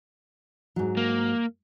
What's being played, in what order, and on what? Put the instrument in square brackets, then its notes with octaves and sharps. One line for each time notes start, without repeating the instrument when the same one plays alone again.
[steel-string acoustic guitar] G#2 F#3
[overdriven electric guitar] A#3